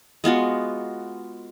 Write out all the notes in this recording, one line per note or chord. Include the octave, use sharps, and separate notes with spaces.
G#3 B3 F4 F#4